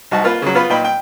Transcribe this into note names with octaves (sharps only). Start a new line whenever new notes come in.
C2 D#4 F#4 A5
A#3 F4 B4
C#3 F#3
B3 F4 B4 B5
A#2 D#4 G5 B5
G5